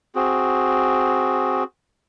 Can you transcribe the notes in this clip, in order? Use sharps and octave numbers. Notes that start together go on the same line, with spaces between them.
C4 F#4 G#4